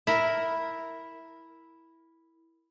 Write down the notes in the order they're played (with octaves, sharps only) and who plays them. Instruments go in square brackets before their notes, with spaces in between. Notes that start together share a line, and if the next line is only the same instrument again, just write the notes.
[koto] E4 A#4